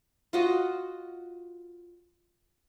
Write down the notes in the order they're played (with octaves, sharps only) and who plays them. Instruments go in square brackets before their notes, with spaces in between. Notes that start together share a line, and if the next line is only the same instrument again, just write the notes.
[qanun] F4 F#4 D#5